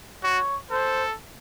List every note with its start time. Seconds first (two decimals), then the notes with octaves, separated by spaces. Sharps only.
0.23 F#4 C#5
0.71 A4 C5